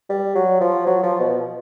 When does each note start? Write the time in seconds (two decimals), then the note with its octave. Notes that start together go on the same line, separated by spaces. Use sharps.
0.10 G3
0.35 F#3
0.61 F3
0.87 F#3
1.03 F3
1.20 B2